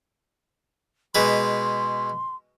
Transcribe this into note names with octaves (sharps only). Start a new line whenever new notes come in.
B2 G#3 B4 C6